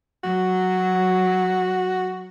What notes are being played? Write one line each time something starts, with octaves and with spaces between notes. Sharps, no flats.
F#3 F#4